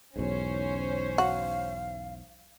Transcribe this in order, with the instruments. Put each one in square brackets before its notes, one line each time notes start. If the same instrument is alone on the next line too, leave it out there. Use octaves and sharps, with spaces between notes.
[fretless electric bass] B1 E2 G#2 [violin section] C#4 C5
[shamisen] F#4 [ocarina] F5